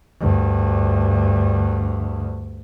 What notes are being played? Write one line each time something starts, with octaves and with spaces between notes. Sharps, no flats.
D2 G2